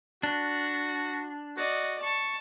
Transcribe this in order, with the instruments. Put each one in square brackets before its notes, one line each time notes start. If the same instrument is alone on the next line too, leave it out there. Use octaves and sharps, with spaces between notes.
[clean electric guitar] D4 [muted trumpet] F#4
[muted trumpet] F#4 [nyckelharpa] D5 D#5
[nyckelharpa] A5 [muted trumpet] C#6